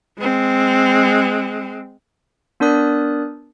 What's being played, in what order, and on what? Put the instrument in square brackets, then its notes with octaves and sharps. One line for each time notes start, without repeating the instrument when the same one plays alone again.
[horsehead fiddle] G#3 C4
[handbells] B3 D4 A#4 D5 D#6 F#6